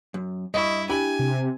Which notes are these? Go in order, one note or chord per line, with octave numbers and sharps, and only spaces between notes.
F#2
G2 E4 D#5 C#6
D4 E4 G4 G#5 B5
C3